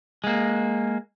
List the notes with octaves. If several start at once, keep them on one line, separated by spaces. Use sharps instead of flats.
G#3 A#3